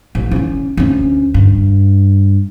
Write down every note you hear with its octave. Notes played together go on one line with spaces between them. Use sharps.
A1
E3 C#4
D2 C#4
G2